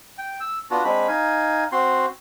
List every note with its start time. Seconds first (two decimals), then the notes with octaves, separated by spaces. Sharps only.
0.18 G5
0.40 E6
0.71 B3 D4 F4 F#4
0.84 G#3 C4 D4 B5
1.08 D#4 F5 G#5
1.72 C4 F#4 C6